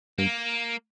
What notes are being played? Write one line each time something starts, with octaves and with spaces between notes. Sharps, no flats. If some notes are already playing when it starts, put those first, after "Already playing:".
G2 A#3